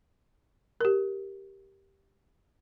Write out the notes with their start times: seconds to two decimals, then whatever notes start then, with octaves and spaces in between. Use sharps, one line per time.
0.81 G4 A#4